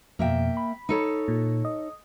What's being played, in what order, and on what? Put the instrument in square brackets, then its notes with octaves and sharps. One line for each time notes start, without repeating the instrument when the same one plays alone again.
[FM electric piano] F2 B2 [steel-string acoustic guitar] A#3 E5 G5
[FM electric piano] B5
[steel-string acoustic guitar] D#4 A4 C#5
[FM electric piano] A#2
D#5